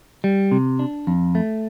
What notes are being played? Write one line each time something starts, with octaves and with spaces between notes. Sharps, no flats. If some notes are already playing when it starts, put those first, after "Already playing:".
G3
C3
D4
F2
A3